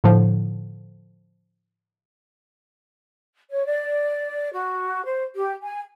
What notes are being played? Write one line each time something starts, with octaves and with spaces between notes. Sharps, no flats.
A2 D3 F3
C#5
D5
F#4
C5
G4
G#5